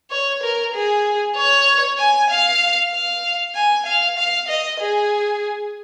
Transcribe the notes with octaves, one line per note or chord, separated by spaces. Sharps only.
C#5
A#4
G#4
C#5
G#5
F5
F5
G#5
F5
F5
D#5
G#4